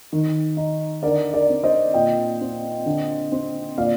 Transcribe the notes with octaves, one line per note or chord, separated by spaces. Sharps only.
D#3
D#4
D3 A#4 D5
A#4 D5
C4
C5 D#5
A#2 D#5 G5
C4
D3
C4
A#2 D5 F5